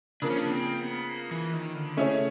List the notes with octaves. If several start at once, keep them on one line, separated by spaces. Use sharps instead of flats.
C#3 F3 A#3 D4
C#4
D4
C4
B3
A#3
E3
D#3
D3
C#3 A3 C#4 E4 G#4 C#5